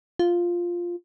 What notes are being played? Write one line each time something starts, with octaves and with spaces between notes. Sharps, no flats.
F4